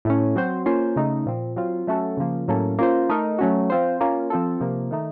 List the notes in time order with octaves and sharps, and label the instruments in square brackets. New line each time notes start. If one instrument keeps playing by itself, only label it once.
[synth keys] A2 A3 C#4
F#3 C4 F#4 C5
A#3 C#4 F4 C5
C#3 A3 D#4
A#2 F3 C4
F#3 C4 F4
F#3 A3 C#4 F#4 A4
C#3 F3 A#3
A2 F#3 A#3 C#4 A4
A#3 C#4 F4 C5
A3 D#4 A#4
F#3 A3 C#4 F#4
F3 C4 F4 C5
A#3 C#4 F4
F3 C4 F4 A4
C3 F3 A#3
D#3 A3 D#4